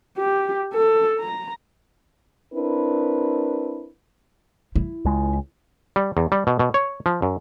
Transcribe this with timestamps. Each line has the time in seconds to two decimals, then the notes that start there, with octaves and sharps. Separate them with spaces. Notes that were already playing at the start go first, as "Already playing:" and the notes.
0.18 G4
0.74 A4
1.20 A#5
2.54 C4 D4 E4 A#4 B4
4.76 E4
5.05 C#2 G#3
5.96 G3
6.17 E2
6.32 G3
6.47 B2
6.59 B2
6.74 C#5
7.06 F3
7.22 F#2